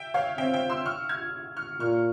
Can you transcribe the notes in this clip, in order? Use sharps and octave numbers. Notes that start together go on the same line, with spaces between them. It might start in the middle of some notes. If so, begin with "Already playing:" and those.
Already playing: E5 G5
C#5 F5
C4 E5 G5
E5 G5
C6 E6
C#6 F6
F6 G#6
C#6 F6
A#2 C#6 F6